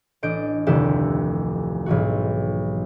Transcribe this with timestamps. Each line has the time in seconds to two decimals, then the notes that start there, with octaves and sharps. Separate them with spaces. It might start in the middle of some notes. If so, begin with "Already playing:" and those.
0.23 A1 D4 D#5 G6 D7
0.67 F1 D2 D#3 E4 G4 E7
1.86 B1 G#2 E3 F#4